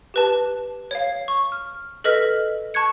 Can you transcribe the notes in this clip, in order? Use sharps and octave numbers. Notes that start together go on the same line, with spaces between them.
G4 B4 A5
C#5 F5
C#6
F6
A4 B4 D#5 F6 B6
A5 C#6 F#6 G#6 C#7